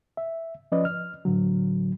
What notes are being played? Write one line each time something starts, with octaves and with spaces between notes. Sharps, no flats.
E5
F3 C#4 B4 D5 D#5
F6
A2 D3 F#3